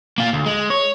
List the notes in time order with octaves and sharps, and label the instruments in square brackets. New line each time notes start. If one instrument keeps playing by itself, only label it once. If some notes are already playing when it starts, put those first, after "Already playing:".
[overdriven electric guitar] A#3 F4
D2
G#3
C#5